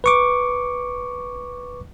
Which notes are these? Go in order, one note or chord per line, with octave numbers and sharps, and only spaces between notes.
B4 C#6 D6